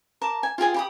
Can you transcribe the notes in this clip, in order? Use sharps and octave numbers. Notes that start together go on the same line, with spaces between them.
A#4 A5 D6
G#5
F4 G4 G#4 G#5
G4 B5 D#6